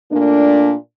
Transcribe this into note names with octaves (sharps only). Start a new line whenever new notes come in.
A#2 A3 A#3 D4